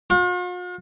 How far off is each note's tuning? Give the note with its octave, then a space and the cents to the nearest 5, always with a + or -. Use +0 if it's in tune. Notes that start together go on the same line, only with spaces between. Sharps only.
F4 +45